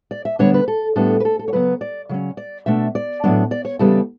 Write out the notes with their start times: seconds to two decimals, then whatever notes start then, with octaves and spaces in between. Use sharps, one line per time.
0.11 D5
0.25 E5
0.39 D2 D3 G3 B3 D4 C#5
0.54 B4
0.68 A4
0.96 A2 G3 B3 D4 A4
1.20 B4
1.25 A4
1.39 A4
1.48 C#5
1.53 C#3 F#3 B3 B4
1.81 D5
2.09 C#3 F#3 C#4
2.37 D5
2.66 B2 A3 D4 E5
2.95 D5
3.24 A2 F#3 B3 D4
3.51 D5
3.65 C#5
3.79 E2 C#3 G3 B3 D4 A4